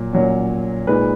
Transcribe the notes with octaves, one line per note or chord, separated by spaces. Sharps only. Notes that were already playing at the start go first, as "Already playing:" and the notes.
Already playing: A#2 F#3
A#2 F#3 C#4
A#2 G#3 D#4 B4